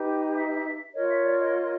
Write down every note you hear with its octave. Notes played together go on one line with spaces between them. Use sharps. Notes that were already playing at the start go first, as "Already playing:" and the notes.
Already playing: D#4 G4 B4
E5
F4 A#4 C#5 D#5
E5
D5
D#5